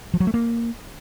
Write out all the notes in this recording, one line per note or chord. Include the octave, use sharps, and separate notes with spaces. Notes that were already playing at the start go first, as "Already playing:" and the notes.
F3
F#3
A3
A#3